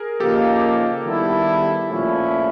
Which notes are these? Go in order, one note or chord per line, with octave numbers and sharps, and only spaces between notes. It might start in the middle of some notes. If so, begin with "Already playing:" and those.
Already playing: G#4 A#4
C#3 F3 A#3 D#4 G4 A4
D#3 G3 B3 E4 A4
A#2 F3 A3 C#4 E4